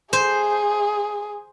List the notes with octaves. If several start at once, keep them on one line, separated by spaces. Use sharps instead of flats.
G#4 C5